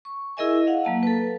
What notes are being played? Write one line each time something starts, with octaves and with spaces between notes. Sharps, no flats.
C#6
E4 G#4 A#4 D#5 E5 G#5
F5 F#5
F#3 A#3 A5
A4 B4